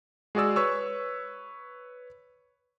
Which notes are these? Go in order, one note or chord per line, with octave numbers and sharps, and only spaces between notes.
G#3 F#4 G#4 D5 E6
B4 C#5 C#6 E6